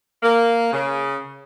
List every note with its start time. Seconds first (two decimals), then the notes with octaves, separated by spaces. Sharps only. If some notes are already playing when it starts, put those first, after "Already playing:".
0.23 A#3
0.72 C#3